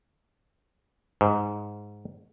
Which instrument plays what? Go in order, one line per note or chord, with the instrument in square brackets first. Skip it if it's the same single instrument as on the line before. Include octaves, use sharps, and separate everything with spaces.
[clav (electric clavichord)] G#2